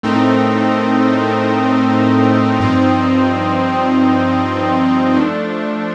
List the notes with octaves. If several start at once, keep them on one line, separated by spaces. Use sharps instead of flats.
A2 A3 C4 D#4 A#4
G2 F3 C4 D#4
F3 A3 D4